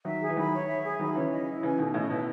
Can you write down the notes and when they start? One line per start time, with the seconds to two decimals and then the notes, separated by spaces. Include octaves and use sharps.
0.05 D#3 F#3 E5
0.21 G#4
0.29 E3
0.37 D#3 F#3 B5
0.53 C#5
0.69 E5
0.84 G#4
0.99 D#3 F#3 B5
1.15 C#3 E3 C#5
1.32 D#5
1.47 E4
1.63 C#3 E3 G#5
1.78 B2 D#3 A4
1.94 A2 C#3 D#5
2.10 B2 E4